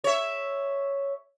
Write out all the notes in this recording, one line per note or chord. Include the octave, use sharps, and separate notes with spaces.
C#5 E5